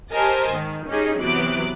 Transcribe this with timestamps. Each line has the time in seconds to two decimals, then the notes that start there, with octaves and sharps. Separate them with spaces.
0.11 G4 A#4 C5 D#5 G#5 A5
0.49 G#2 D#3
0.88 C#4 D#4 G4 G#4
1.19 C3 E3 F#3 B3 D6 F#6